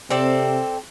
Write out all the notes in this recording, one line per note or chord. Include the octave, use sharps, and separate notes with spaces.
C3 C4 A4 D5